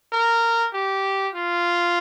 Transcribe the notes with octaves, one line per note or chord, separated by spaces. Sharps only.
A#4
G4
F4